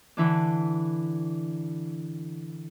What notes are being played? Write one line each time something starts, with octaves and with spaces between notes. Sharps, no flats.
D3 E3 D4